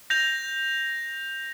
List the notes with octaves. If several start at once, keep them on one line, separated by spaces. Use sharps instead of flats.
G6 A#6 F7